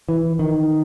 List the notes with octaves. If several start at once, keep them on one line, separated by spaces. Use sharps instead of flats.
E3
D#3